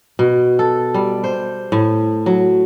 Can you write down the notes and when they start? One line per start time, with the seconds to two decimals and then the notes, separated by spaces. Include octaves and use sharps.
0.19 B2
0.59 A4
0.94 G3
1.24 C5
1.72 A2
2.26 F#3